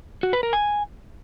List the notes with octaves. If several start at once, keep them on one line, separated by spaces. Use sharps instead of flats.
F#4
B4
A#4
G#5